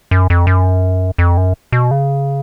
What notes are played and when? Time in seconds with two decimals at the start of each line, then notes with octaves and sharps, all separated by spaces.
0.11 F#2
0.30 F2
0.47 F#2
1.18 F2
1.37 F#2
1.72 B2
1.91 C#3